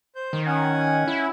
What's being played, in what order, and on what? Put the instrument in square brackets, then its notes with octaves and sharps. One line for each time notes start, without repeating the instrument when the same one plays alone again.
[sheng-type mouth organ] C5 G6
[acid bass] D#3
[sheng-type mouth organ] C#4 F#5 G#5
[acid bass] E4